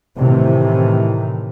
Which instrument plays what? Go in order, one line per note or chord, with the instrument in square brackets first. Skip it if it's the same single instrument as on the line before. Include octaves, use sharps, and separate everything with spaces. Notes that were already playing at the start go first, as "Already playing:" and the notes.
[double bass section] A2 C3 D#3 E3